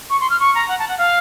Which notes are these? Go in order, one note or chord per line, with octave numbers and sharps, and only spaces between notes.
C#6
C6
F6
C#6
A#5
F#5
A5
F#5
F5